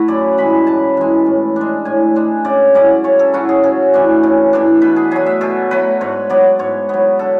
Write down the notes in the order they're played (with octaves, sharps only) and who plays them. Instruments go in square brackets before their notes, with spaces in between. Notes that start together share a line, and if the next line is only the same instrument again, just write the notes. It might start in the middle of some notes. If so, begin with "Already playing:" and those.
Already playing: [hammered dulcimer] A3 E4 F#4 A4 B4
F#2 D5
E3 G#3 B5
F#2 A5
E3 G#3
A2
G#3 D4
A2 G#5
G#3 D4
C#3 D5
F#3 C#4 E4 D5
C#3 C#5
A4
F#3 C#4 E4 F#4
G#4
C#3 A4
E3 A3 D4
C#3
E3 A3 D4
B2 B4
G#4
F#3 A3 G#4
E5
B2 A4
F#3 A3 B4
G#2 C#5
F#3 B3 D5
G#2 C#5
F#3 B3
D3 A4